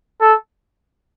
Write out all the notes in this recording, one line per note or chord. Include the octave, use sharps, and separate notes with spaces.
A4